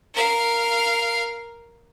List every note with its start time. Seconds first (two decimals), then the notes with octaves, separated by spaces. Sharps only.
0.14 A#4 F5